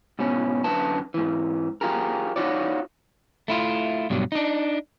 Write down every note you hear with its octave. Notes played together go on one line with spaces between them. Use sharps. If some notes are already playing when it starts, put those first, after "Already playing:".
G#2 B2 C#4
F#2 D3 B4 A5
G#2 E3
F4 G4 G#4 A#4
D#4 F4 F#4 C#5 D5
A3 E4 F4
G2 B2 F#3 G3
D4 D#4